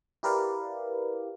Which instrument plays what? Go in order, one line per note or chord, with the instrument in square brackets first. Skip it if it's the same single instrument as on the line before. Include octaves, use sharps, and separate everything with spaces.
[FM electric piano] E4 G4 A#4 B4 D5 F5